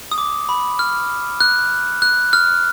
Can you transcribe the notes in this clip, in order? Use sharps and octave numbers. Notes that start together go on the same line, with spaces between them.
D#6
D6
B5
F6
F#6
F#6
F6